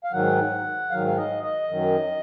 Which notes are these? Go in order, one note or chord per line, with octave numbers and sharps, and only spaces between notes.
F5
G#2 D#3 F#3 F#5
G#2 D#3 F#3 F5
F5
D#5
D#5
F#2 D#3 F#3